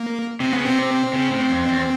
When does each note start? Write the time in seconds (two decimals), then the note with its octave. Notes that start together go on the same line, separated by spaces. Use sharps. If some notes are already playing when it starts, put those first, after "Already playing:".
Already playing: A#3
0.40 C3 C4
0.53 C#3 B3
0.66 C3 C4
1.13 C#3
1.31 A2
1.50 F2
1.68 E2